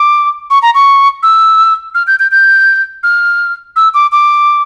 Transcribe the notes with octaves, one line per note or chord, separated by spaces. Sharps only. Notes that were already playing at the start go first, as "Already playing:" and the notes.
Already playing: D6
C#6
A#5
C#6
E6
F6
G6
G6
G6
F6
E6
D6
D6